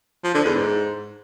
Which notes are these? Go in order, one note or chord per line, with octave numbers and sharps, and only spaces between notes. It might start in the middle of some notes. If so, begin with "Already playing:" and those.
F3
D3
E2
G#2